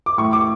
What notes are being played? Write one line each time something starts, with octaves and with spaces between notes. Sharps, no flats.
D6
A2 C#6
D6